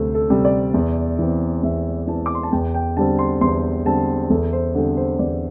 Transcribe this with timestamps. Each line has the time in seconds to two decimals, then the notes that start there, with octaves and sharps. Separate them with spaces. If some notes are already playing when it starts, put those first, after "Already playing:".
Already playing: D2 C3 G3 A4 C5
0.14 A4
0.30 C3 G3
0.45 D5
0.74 E2
1.19 E3 C4
1.63 E2 E5
2.08 E3 C4 A5
2.26 D6
2.35 C6
2.43 A5
2.52 E2 G5
2.74 G5
2.97 D3 G3 C4 A5
3.19 C6
3.41 E2 C6
3.85 D3 G3 C4 A5
4.30 E2 A4
4.53 C5
4.75 D3 G3 C4 A4
4.97 C5
5.19 E2 D5